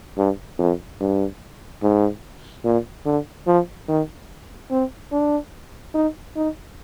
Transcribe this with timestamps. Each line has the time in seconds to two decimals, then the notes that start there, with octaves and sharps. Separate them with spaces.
0.17 G2
0.59 F2
1.00 G2
1.82 G#2
2.65 A#2
3.05 D3
3.47 F3
3.88 D#3
4.71 C4
5.12 D4
5.94 D#4
6.36 D#4